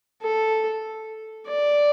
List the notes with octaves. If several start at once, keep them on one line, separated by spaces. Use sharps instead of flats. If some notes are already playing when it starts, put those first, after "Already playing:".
A4
D5